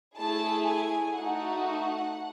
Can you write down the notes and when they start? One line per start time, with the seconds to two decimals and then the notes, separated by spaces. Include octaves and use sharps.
0.16 A3 E4 G#4 A5
0.67 G#5
1.18 A3 D#4 F#4 F#5